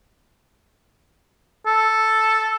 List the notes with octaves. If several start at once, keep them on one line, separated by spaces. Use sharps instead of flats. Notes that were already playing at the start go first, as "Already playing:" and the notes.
A4